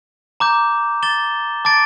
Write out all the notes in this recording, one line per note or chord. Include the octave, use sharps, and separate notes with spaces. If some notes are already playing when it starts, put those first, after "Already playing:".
A#5 D6 G6
D6 A6 E7 G7
A5 D6 A6 D7